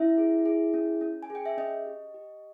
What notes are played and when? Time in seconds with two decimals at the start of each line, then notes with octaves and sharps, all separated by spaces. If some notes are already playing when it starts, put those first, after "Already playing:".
Already playing: C#4 E4 E5
0.18 G#4
0.46 G#4
0.73 C#4
1.01 C#4
1.23 G#5
1.30 G#4
1.35 G5
1.46 E5
1.57 C#4 D#5
1.86 G4
2.14 G4